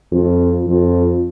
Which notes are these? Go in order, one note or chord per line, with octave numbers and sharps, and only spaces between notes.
F2
F2